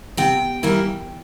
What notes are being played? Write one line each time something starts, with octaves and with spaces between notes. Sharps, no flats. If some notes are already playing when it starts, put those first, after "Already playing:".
C3 G5
E3 G3 A#3 E4